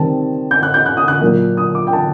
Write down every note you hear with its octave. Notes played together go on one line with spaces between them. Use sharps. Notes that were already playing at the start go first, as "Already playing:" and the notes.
Already playing: C3 D#3 G3 C4 A5
G6
F#6
G6
F#6
D#6
F#6
A#2 F#3 A#3
D#6
D6
G5
A5